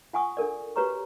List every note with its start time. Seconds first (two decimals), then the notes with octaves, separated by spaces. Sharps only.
0.13 F4 F#5 G#5 C#6 D#6
0.37 D4 A4 A#4 D5
0.76 F#4 G4 B4 C#5 A#5 C#6